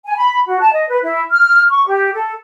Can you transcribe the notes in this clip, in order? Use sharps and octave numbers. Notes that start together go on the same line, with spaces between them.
G#5
B5
F#4
A5
D#5
B4
E4
F6
C#6
G4
A4